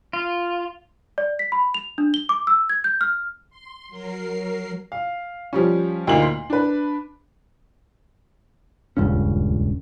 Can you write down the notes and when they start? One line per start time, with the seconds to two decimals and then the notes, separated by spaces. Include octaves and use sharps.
0.13 F4
1.18 D5
1.39 B6
1.52 B5
1.74 F7
1.98 D4
2.14 G7
2.29 D6
2.47 E6
2.69 G#6
2.84 G6
3.01 F6
3.50 C6
3.89 F#3 A#4 C7
4.92 F5
5.53 F3 G3 C#4
6.07 D2 A#2 A#3 D#4 F#7
6.22 C6
6.50 D4 B4
8.97 D#1 C#2 G2 C#4